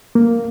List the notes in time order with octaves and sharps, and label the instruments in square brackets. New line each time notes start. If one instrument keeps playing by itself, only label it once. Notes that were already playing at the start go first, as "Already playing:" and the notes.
[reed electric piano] A#3